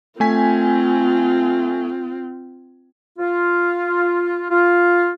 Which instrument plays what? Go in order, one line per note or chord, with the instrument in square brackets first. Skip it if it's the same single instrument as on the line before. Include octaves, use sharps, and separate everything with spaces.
[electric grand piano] A3 G#5 B6 [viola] C4 F4
[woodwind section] F4
F4